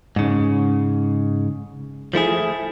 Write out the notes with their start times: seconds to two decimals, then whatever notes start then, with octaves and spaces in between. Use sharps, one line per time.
0.16 G#2 C#3
2.14 F3 A3 E4 G#4